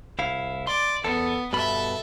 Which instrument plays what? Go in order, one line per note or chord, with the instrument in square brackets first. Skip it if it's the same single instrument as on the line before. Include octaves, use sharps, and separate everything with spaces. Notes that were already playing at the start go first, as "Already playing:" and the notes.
[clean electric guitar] C2 E4 F5
[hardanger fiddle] D5 [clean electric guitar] C6
[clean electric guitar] E2 A4 [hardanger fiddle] B3
[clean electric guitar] G2 B2 B5 [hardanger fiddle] A4 E5